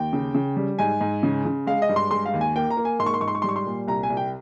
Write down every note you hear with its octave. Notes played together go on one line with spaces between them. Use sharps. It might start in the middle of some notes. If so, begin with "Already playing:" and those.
Already playing: D#2 G5
C#3
C#3
G3
G#2 G#5
G#2
C#3
C#3
G#3 F5
D#5
G2
C6
G#3 C6
F5
D#2
G#5
A#3 G5
A#5
A#3
G#5
G#2 C6
C#6
C6
G#2 C#6
C6
C#6
G3 C6
C#6
C6
A#2
C2 A#5
G#5
C2
G5